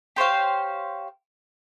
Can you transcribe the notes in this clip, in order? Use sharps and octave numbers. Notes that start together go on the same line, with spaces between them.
G4 C5 C#5 F5